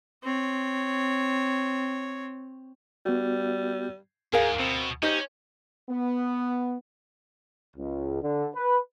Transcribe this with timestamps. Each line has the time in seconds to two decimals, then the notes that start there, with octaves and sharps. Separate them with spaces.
0.23 C4 C#5
3.05 G3 B3 F#4
4.33 D2 G#2 G#4 A#4 F5
4.59 B2 C4
5.03 C#4 D#4 G4 C5 D#5
5.89 B3
7.77 C#2
8.21 D3
8.55 B4